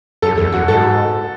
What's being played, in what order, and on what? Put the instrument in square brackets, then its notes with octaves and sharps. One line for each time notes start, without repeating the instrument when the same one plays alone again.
[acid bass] F#2 [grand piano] A4
[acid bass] E2 [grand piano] A4
[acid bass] F#2 [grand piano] F#4
[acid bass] G#2 [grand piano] A4